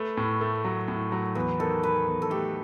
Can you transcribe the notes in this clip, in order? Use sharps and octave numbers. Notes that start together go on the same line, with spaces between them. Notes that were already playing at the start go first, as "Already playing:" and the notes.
Already playing: A3 B4
A2
A3
F#3
A2
F#3
E2 B4
D#3 A4
D#3 B4
E2
A4
A3 G4